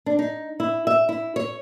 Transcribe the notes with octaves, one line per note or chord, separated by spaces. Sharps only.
D4
D#4
E4
E5
E4
C#5